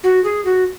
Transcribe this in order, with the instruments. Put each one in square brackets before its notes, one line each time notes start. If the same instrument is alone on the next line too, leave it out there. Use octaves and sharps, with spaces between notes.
[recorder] F#4
G#4
F#4